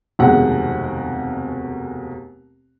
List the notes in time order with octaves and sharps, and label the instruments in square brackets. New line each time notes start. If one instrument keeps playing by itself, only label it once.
[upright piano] F1 D#2 B2 G#3 F#5